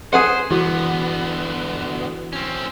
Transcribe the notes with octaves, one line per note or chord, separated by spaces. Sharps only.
G#4 B4 C5 F#5
D3 E3 B3 E4 F#4
C4 C#4